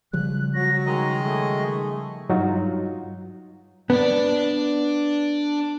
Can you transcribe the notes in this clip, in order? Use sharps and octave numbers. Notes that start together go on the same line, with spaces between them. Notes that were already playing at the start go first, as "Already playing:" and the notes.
C#3 F3 G3 F#6
F#3 F#4 C#5 A#6
D#3 G#3 D#5 A#5
A3 G#4 C#6
G2 F#3 D#4 F4 F#4
B3 D4 D5